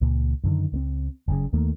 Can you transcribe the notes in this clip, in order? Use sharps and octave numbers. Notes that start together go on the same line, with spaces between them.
C#2 A#2
F#2 D3 D#3
C#2 A3 C4
F#1 F#2 A2 C#3
D#2 D#3 A3 A#3